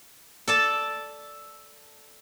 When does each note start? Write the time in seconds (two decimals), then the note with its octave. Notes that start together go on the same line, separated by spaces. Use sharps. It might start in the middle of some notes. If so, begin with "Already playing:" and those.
0.48 A4 D5 A5